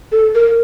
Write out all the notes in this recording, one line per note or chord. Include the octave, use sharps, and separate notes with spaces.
A4
A#4